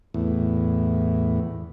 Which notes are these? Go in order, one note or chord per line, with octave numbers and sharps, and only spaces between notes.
E2 A2